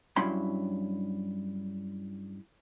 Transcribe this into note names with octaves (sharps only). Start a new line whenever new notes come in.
G2 F#3 C#4 E4 B5 C6